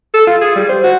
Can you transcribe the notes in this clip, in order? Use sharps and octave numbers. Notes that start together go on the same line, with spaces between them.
A4
F4
G#4
G3
C5
F#4